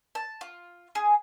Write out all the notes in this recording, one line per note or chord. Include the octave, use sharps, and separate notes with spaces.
A5
F4
G#4